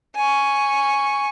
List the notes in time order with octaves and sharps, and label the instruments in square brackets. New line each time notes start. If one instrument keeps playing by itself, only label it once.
[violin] G#5 C#6